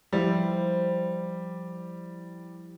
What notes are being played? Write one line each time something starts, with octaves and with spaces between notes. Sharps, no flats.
F3 G3 E4 C5